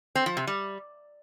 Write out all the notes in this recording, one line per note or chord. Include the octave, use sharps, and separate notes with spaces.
C4
F3
C3
G3